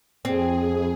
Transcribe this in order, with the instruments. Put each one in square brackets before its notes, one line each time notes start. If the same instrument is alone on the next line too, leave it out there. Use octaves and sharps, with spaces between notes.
[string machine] F2 G#4 [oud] C4